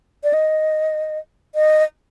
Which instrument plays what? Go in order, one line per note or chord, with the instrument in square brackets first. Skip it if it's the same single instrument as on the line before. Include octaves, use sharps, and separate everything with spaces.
[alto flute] D5
D#5
D#5